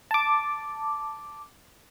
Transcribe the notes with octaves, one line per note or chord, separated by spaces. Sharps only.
A5 D6